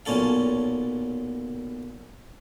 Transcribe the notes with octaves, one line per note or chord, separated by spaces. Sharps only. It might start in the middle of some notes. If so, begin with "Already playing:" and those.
B1 A#2 C#4 A4 F5